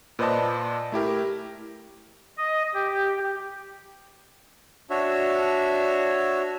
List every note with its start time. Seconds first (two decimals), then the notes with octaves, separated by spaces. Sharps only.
0.19 A#2 B4 C5 D5 D#5 A5
0.92 A3 E4 G4 A#4
2.37 D#5
2.74 G4
4.90 D4 F#4 C#5 E5